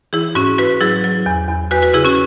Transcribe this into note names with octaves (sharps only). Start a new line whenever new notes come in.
E3 E4 G#4
G#2 C#4 F#4
G#2 F#4 B4
F#3 E4 G#4
F#3
E2
E2
E2 F#4 B4
F#4 B4
C#3 E4 G#4
C#4 F#4